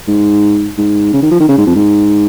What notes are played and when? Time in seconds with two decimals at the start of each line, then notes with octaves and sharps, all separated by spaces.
0.08 G#2
0.78 G#2
1.13 C#3
1.22 D#3
1.31 F3
1.40 D#3
1.49 C#3
1.58 G#2
1.66 F2
1.75 G#2